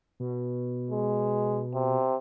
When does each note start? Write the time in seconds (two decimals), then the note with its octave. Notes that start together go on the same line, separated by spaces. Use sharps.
0.20 B2
0.90 G#3
1.74 C3